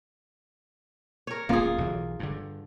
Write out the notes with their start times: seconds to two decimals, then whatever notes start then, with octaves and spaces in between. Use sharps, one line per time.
1.27 A#4 C#5
1.49 D1 A#3 C#4 F4 G#4
1.78 B1 E3
2.19 G2 D3